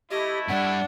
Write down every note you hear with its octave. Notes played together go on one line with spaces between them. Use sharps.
A3 E4 G4 D#5
G2 G3 D4 F#5